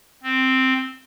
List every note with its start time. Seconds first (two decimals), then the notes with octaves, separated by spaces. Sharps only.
0.23 C4